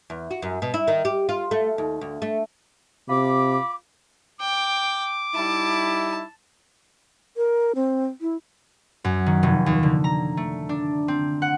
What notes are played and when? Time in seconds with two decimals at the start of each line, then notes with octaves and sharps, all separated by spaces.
0.10 E2
0.31 F#4
0.42 F#2
0.62 B2
0.74 E4
0.88 D#3
1.05 G4
1.29 F4
1.51 A3
1.78 D#2
2.01 D2
2.22 A3
3.09 C3 F4 B5 D6
4.41 G5 D6
5.35 G3 D#4 E4 A5
7.37 A#4
7.75 C4
8.21 E4
9.04 F#2
9.26 D#3
9.43 F1
9.66 D#2
9.83 D3
10.04 A#5
10.37 A3
10.69 D4
11.08 C4
11.42 F#5